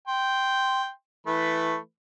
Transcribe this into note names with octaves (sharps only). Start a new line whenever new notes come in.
G5 C6
E3 A3 B4